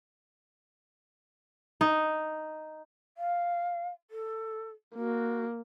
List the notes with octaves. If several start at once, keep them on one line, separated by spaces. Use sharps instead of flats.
D#4
F5
A4
A#3 F#4